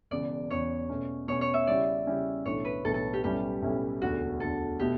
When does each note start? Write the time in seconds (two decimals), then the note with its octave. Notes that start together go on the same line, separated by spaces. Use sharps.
0.11 E1 E2 C#3 D5
0.50 E1 E2 C#3 C#5
0.89 B2 A3 C#4
1.28 B2 A3 C#4 C#5
1.41 C#5
1.54 E5
1.67 C#3 G3 C#4 E4 G4 D5
2.07 C#3 G3 C#4 E4 G4
2.46 B1 A2 E3 A3 D4 C#5
2.65 B4
2.84 B1 A2 E3 A3 D4 A4
2.94 A4
3.13 G4
3.24 B1 A2 G3 C#4 E4 G4
3.62 B1 A2 G3 C#4 E4
4.02 E1 D2 D3 F#4
4.40 E1 D2 D3 A4
4.79 B2 A3 G4